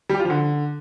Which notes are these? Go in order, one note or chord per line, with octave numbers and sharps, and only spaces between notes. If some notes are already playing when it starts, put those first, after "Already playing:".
G3
G4
F4
F3
D3